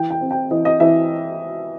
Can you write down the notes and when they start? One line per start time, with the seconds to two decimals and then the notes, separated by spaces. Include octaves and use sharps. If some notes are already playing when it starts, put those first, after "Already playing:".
Already playing: E3 G5
0.11 G5
0.21 C4
0.31 G5
0.51 E3 D#5
0.65 D#5
0.80 E3 E5